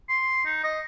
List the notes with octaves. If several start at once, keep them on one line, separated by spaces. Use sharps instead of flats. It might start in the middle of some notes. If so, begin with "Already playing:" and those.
C6
D#4
D#5